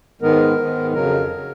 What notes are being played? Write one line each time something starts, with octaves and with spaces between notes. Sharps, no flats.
G#2 D#3 G#3 B3 A#4
G#2 D#3 G#3 B3
F2 C#3 F#3 A#4
C#3 F#3